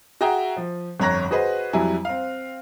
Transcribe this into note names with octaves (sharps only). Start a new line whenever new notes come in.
F#4 G#4 E5 G5 A#5
F3
G1 F2 C#5 A#5 F#6 A#6
F#4 G#4 B4 C5 D#5
F2 F#3 G3 E4 G#5
C4 F5